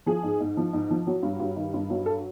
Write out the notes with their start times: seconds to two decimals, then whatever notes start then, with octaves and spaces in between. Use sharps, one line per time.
0.06 F3 G#4
0.23 G#2
0.40 G#2
0.57 F3
0.73 G#2
0.90 F3
1.07 F#3
1.23 G2
1.40 G2
1.56 D#3
1.74 G2
1.90 F#3
2.06 A4